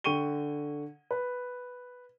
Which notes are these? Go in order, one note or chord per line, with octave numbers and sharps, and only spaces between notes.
D3 G5 C#6 D#7 G7
B4